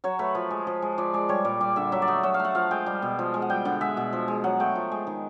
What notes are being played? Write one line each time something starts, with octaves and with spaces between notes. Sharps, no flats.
F#3 C#5
A3 B4
F3 B4
G#3
F3
G#3
F3 D5
G#3 D5
G3 C#5
A#2 D5
G3 D5
D3 E5
F#3 E5
D5
A3 D#5
F#3 E5
F5
A3
F#5
F3 F5
G#3 G5
G3
B2
F3
G#3
F#5
G3 G5
D3 F#5
G#3 E5
B2
F3
G#3
F#3 F#5
A3 G5
F3
G#3
D#3